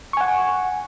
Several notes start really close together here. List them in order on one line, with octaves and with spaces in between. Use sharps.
C#6 G#5 F#5